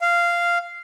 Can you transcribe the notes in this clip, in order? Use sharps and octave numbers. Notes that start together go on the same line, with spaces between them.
F5